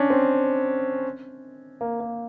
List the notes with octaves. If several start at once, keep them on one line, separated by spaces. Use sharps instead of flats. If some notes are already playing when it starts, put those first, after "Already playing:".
Already playing: C#4 D4
C4
A#3
A#3